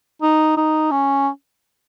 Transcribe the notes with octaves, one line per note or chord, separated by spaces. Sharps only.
D#4
D#4
C#4